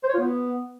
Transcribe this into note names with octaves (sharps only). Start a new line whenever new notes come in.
C5
C#5
F4
B3